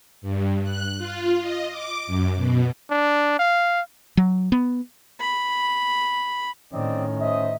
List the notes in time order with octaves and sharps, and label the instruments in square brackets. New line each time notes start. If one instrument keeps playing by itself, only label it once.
[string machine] G2
F#6
F4
D#5
D6
F#2
B2
[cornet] D4
F5
[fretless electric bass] F#3
B3
[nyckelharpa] B5
[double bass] A2 D#3 [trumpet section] C4 D5 D#5 [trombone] C#4
[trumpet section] C5 D#5 [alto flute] E5